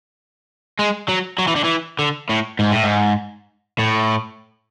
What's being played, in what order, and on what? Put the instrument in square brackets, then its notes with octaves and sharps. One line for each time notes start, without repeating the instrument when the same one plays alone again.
[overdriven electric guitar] G#3
F#3
F#3
E3
D3
E3
D3
A2
G#2
A2
G#2
A2